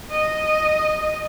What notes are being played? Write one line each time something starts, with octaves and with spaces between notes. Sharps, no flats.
D#5